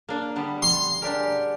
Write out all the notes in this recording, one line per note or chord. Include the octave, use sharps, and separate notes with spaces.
A#3 D4
D3 G3 B3
C6
D4 G4 G#4 A#4 D5 F#5